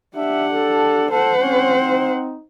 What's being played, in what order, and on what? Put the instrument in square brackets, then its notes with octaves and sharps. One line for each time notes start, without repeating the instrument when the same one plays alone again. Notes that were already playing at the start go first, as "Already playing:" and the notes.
[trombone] D4 [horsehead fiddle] G4 F#5 [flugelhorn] E5
[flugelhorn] A4
[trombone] A4 [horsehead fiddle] C5 F#5
[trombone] C4 [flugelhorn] C#4
[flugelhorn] D#4